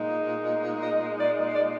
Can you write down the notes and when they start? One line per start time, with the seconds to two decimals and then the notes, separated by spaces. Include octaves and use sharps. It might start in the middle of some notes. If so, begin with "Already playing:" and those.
Already playing: A#2 G#3 D#4
0.82 D#5
1.18 D5
1.54 D5